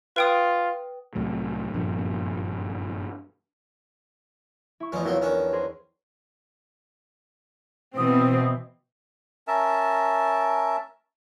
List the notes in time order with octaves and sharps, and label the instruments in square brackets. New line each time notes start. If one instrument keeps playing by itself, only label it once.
[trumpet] F4 [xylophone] B4 G5 D#6
[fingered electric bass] C2 A2 F#3
F#1 G2 A#2 F3
[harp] E4 C#6
[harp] E2 F3 A3 [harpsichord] C#4 D#4
[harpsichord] C3 F3 F#3 [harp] E4 A#4 C#5
[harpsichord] D#3 C#4 D4
[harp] G#4 A#4 C5
[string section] B2 E3 C4 [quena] D#6
[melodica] C#4 A#4 E5 A5